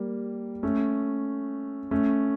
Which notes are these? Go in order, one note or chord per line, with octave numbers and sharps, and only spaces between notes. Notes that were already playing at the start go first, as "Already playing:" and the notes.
Already playing: G3 A#3
A3 C#4
A3 C#4